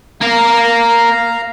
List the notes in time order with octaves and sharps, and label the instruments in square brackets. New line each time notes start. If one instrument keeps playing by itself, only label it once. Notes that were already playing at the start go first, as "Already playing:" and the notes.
[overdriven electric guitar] A#3 A#4 [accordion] F5 A#5